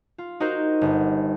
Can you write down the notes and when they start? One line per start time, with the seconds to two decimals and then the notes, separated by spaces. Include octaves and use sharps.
0.18 F4
0.40 D#4 F#4 A#4 C5
0.81 G1